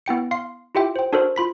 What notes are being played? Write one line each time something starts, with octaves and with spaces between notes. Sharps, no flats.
B3 E4 G5 C#7
F5 C6 C7
E4 F4 G4 E5 G5
C5 G5
D4 F#4 A4 A#4 C5
F4 B5 B6